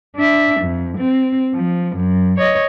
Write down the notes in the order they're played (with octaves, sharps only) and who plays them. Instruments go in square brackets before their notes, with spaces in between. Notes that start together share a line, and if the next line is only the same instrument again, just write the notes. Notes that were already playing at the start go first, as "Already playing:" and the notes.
[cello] D4 E5
F2
C4
F3
F#2
C#5 D#5